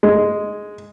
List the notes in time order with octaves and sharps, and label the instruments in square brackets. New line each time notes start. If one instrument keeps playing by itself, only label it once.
[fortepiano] G#3